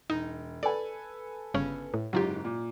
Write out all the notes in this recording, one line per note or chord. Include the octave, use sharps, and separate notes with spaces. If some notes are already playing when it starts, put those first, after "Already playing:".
E1 D#4
A4 B4 D5 G#5
G1 C#3 C#4
A2
F#1 G#2 F#3 F4 G4
A#2